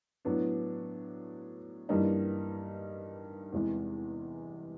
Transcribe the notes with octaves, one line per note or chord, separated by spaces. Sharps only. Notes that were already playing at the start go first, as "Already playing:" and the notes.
A2 F#3 B3 D4
G2 E3 G3 A#3 D#4
E2 C3 E3 G#3